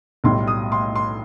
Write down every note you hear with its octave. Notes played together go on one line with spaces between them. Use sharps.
B1 A2 G3 C6
D#6
C6
C6